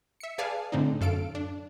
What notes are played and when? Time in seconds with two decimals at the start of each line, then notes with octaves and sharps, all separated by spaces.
0.20 E5 C#7
0.38 G#4 B4 D5 F5 G#5 A5
0.72 A2 D3 C4 D4 D#4
1.01 F#2 A4 F5 D7
1.35 D4